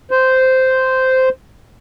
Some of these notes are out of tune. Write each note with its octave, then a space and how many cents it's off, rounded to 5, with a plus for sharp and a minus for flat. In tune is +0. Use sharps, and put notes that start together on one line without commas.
C5 -10